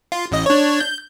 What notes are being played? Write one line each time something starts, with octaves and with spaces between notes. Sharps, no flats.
F4
A1 D#5
D4 C#5
G6